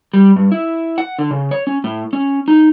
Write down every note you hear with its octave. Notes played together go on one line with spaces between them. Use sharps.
G3
G2
E4
F#5
D3
C#3
C#5
C#4
A2
C#4
D#4